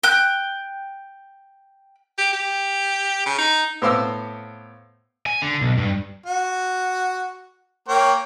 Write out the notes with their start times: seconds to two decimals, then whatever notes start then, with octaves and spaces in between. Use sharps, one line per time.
0.03 G5 F#6
2.18 G4
2.33 G4
3.26 C#3
3.39 D#4
3.82 A2 B3 C5 F5 D6 E6
5.26 G#5
5.42 D3
5.61 B1
5.78 G2
6.26 F#4
7.88 A#3 C#5 G5